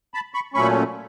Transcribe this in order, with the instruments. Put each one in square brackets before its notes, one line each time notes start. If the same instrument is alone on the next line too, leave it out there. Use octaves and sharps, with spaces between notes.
[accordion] A5 B5
B5 C#6
A#2 F#3 A3 C#4 B5 C#6